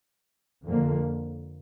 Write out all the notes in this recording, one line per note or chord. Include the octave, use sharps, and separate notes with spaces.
F2 D3 F3 A#3